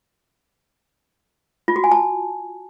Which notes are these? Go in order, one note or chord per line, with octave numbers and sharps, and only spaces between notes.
F4
F#4
G#5
A5